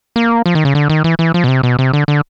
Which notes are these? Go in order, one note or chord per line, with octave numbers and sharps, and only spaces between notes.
A#3
F3
D#3
C#3
D3
D#3
E3
E3
F3
B2
C3
B2
C3
D3
D3